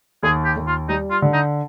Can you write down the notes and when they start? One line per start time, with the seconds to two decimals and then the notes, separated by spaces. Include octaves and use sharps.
0.23 D#2 G#4
0.45 G4
0.56 D#2
0.67 F4
0.89 G3 D#4
1.11 F4
1.22 D3
1.33 D#4